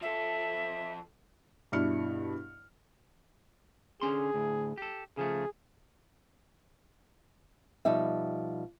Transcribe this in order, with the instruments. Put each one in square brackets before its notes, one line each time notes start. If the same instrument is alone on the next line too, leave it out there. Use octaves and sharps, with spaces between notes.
[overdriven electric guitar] F3 A4 [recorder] E5
[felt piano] G2 B2 D4 E4 F6 C#7
[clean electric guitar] D3 C#4 C6 [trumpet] G#4
[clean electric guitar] D2 A2
G4 A4
[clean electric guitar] C#3 F3 A3 [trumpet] G#4
[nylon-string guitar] B2 F3 G3 D#4 E5